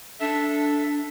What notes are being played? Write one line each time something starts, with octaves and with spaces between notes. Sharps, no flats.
D4 A4 E5